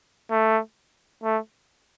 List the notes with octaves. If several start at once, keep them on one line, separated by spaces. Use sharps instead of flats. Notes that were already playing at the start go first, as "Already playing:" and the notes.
A3
A3